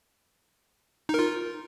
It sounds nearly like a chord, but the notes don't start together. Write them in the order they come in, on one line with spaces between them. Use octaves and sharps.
D#4 A#4 F4